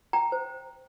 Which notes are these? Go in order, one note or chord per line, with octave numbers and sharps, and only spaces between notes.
G5 A#5
C5